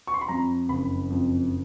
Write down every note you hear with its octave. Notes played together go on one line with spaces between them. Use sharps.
C#6
C6
B5
F2 A#5
F#1 B5
F2